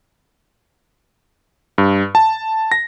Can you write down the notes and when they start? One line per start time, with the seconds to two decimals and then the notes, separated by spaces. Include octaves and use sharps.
1.78 G2
2.15 A5
2.72 A#6